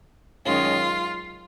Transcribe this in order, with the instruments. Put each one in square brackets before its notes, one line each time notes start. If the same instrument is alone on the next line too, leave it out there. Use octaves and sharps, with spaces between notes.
[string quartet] F#2 D#3 G#3 C#4 F4